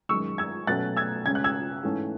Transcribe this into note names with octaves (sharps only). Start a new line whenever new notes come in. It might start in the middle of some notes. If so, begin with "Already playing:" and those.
F#2 D#3 G#3 C#6 E6
E6 G#6
B2 F#3 A3 C#4 F#6 A6
E6 G#6
C#3 G#3 C#4 G#6
F#6
E6 G#6
G#2 E3 A3 C#4